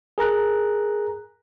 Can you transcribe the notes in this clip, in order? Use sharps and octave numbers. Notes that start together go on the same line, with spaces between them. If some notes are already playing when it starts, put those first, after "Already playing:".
G#4 A#4 A#5 F#6